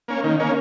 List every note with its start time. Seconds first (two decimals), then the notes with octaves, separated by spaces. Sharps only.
0.08 A#3 C#4
0.24 D#3
0.39 A#3 C#4